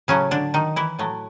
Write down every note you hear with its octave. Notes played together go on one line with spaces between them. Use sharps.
A2 C#3 F#3 A3 C#4
D3 D4
D#3 D#4
E3 E4
A2 F#3 A3